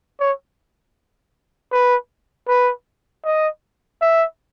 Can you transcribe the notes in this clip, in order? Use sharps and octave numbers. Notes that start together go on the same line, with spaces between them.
C#5
B4
B4
D#5
E5